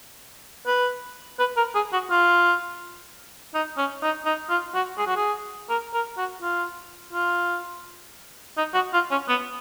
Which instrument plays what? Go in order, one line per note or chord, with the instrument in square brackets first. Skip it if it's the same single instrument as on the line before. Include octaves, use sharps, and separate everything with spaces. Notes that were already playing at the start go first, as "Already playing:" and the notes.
[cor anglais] B4
B4
A#4
G#4
F#4
F4
D#4
C#4
D#4
D#4
F4
F#4
G#4
F#4
G#4
A#4
A#4
F#4
F4
F4
D#4
F#4
F4
C#4
B3